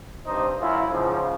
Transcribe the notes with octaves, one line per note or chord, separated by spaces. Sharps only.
G2 C3 D#4 C5
F#2 E4 F4
G#2 C#3 F3